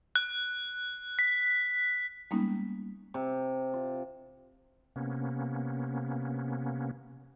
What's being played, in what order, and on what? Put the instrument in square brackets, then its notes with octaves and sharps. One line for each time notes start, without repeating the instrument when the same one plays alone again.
[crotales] F#6
B6
[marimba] G3 G#3 A#3 B3 C#4 D#4
[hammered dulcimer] C3
F4
[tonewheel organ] C3 A#3 B3 C#4